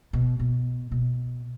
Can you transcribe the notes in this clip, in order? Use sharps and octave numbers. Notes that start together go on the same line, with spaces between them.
B2
B2
B2